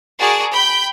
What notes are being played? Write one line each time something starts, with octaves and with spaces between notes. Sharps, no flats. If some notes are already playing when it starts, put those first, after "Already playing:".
F#4 G#4 A#4 D5 A5
G5 B5 G6